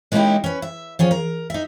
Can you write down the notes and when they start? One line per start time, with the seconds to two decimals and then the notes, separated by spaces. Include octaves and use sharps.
0.12 G#3 A#3 C#4 D#4 E4 G4
0.44 C#4 B4
0.62 E5
0.99 F3 C#4 F4 G#4
1.11 A#4
1.50 D#4 E5